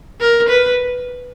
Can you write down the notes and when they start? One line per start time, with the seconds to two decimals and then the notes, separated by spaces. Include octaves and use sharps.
0.20 A#4
0.49 B4